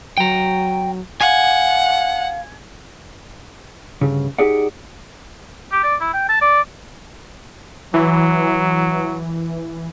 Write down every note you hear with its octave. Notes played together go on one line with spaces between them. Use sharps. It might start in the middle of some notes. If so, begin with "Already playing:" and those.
F#3 G5 A#5
F5 F#5 G#5
D2 G2 C#3
D#4 G4 G#4 D5 F#5
G4
D5
E4
G5
A5
D5
E3 F#3